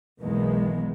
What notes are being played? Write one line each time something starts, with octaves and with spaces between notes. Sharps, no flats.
B1 E2 D#3 G#3 A#3 B3